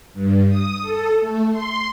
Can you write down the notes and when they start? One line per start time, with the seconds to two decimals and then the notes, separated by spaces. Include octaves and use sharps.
0.14 G2
0.49 D#6
0.82 A4
1.21 A3
1.51 C6